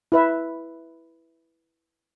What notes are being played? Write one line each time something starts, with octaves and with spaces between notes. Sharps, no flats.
E4 B4 E5